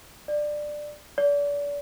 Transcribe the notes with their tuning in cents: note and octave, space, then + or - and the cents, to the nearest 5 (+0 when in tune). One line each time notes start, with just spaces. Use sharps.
D5 +15
D5 -35